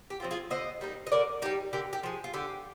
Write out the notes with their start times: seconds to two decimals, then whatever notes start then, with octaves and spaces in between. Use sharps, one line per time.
0.10 G4
0.20 F3 C4 F4
0.31 F4 G#4
0.50 D3 C5 D#5
0.81 G3 A#3 D#4
1.07 D#5
1.12 D3 A#4 D5
1.42 G3 A#3 D#4 G4
1.73 D3 G4 A#4
1.93 G4
2.03 F3 G#3
2.24 F4
2.34 D3 G4